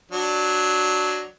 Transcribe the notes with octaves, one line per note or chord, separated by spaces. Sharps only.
F#3 D4